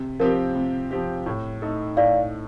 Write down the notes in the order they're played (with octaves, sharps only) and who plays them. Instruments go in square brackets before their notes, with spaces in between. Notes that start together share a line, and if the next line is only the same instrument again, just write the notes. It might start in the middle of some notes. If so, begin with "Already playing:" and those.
Already playing: [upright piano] C3
[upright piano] F3 C4 G4 [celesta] A#4
[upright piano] C3
F3 C4 G4
A2
A3 D#4 A4
[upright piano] A2 [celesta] D5 F5